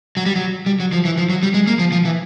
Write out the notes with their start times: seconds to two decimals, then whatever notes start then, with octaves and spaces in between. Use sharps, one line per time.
0.17 F#3
0.26 G3
0.36 F#3
0.66 G3
0.80 F#3
0.92 F3
1.05 E3
1.18 F3
1.30 F#3
1.43 G3
1.54 G#3
1.67 A#3
1.79 F3
1.92 F3
2.05 E3